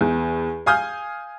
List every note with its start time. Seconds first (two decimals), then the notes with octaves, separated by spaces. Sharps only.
0.01 E2
0.66 F5 G#5 D#6 F6 G6